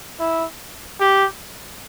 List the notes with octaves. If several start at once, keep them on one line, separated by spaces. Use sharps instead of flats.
E4
G4